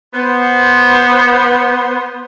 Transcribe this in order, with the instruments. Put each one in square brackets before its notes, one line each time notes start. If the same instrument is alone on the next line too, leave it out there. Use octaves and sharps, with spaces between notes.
[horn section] B3 C5